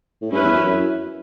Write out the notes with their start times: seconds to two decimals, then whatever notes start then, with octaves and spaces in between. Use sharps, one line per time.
0.22 A2
0.32 G2 C#4 E4 B4
0.43 E2
0.54 F#2
0.65 F#2